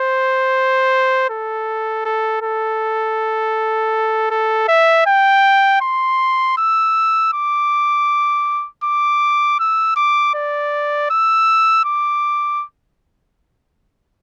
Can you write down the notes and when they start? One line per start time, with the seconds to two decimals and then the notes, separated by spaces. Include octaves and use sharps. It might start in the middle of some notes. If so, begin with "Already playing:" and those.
Already playing: C5
1.30 A4
2.05 A4
2.42 A4
4.31 A4
4.68 E5
5.06 G5
5.81 C6
6.58 E6
7.33 D6
8.84 D6
9.59 E6
9.96 D6
10.34 D5
11.10 E6
11.85 D6